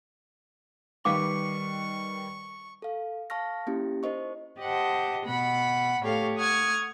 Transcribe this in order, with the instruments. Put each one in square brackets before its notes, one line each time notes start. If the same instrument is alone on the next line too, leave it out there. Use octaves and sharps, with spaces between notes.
[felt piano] D#3 G3 B4 [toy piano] F5 D6 [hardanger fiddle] C#6
[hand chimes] A4 F5
F5 A5 C#6 F6 A#6
A#3 C#4 E4 G4
D#4 A#4 C5 D#5 C#6
[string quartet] G4 C5 D#5 F#5 A5
B2 F#5 B5
A2 G4 A4 C#5 F5
F#5 C#6 D#6 F6 G#6